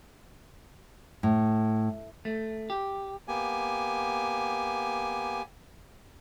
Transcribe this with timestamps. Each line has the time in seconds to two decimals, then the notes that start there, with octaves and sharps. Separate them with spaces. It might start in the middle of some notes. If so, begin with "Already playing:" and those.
1.23 A2
2.25 A3
2.70 G4
3.28 A#3 B3 G4 G#5